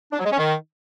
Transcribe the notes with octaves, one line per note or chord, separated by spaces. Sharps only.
D4
F#3
G#3
C#4
D#3